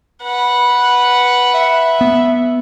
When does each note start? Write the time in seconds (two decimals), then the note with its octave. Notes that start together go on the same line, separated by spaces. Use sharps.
0.23 B4 F#5
1.54 E5
2.01 B3